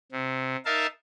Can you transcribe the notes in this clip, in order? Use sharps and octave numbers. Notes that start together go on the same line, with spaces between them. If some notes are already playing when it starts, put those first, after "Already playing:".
C3
D#4 A#4 E5 F5 A5